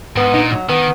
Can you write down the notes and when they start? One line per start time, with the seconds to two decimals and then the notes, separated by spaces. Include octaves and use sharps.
0.16 G#2 B3
0.34 A#2 D#4
0.51 F#3
0.69 D#3 B3